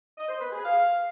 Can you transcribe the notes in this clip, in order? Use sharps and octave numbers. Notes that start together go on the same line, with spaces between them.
D#5
C5
B4
G#4
F5